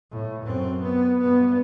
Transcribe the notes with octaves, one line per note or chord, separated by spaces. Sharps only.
A2
F#2 C4
B3
G2 B3